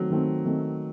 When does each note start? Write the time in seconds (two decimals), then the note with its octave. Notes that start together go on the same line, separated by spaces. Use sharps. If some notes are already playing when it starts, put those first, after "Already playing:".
Already playing: D#3 F#3 A3 C4
0.10 D#3 A3 C4
0.45 D#3 A3 C4